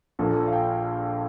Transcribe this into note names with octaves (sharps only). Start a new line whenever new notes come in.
A#1 A#2 F3 A4
F5
G5